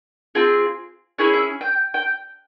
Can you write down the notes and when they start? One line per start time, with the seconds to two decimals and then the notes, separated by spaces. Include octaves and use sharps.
0.35 C4 F4 G#4
1.18 C#4 E4 G#4 C#5
1.33 E5
1.61 G5
1.94 G5